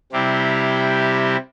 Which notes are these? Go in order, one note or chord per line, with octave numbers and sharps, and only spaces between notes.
C3 G3 C4 E4 G4